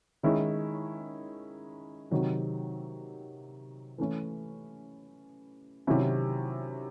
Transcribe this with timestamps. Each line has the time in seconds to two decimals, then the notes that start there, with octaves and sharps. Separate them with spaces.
0.23 D#3 G#3 C#4 E4
2.11 C3 D#3 F#3 C4
3.98 E3 A3 C#4 E4
5.87 C3 D#3 F#3 C#4 E4